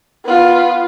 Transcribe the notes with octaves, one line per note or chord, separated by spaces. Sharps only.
B3 F4